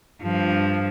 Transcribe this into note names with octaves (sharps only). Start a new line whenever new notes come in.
G2 F3